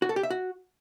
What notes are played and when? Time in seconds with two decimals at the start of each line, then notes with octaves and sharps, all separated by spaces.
0.02 F#4
0.09 A4
0.16 G4
0.23 E5
0.30 F#4